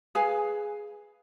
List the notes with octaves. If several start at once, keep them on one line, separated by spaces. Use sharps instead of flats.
G#4 B4 F5 G#5